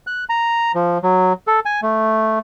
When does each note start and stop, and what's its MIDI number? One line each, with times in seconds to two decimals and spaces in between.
0.07 0.24 90
0.29 0.72 82
0.75 0.98 53
1.03 1.33 54
1.47 1.60 69
1.65 1.80 80
1.82 2.39 57